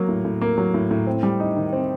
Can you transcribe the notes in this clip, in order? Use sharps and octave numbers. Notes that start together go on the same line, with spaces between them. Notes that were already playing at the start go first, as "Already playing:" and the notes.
Already playing: F#3 A#3
A2
A2
A#3
F#3
A2
A2
C4
G3
D#4
D#3
C4